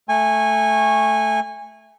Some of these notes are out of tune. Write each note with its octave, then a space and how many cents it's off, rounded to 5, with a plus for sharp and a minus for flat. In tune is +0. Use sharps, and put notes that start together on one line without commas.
A3 +0 G#5 -20 C#6 -15